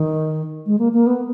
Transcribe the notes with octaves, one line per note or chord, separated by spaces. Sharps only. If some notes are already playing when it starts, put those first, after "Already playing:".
Already playing: D#3
G#3
A#3
A#3
B3